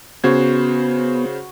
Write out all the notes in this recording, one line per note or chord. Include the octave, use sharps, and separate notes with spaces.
C#3 B3 F#4 C5 G#6